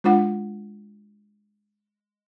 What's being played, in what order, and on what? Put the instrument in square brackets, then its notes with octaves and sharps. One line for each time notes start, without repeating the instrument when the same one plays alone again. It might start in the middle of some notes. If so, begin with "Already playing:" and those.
[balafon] G#3 D4 F4 F#5